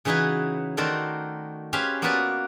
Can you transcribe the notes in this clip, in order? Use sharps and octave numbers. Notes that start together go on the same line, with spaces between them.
C#3 E3 C#4 D#4 F#4 B4
D#3 A3 F#4 A#4 C5 D5
C#4 G4 G#4 B4 C5 F5
A#3 B3 F4 F#4 B4 D5